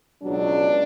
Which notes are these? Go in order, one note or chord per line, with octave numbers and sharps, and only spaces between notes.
C#2 B2 F#3 D4